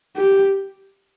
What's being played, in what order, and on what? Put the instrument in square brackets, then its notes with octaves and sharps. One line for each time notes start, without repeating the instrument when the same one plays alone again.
[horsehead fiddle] G4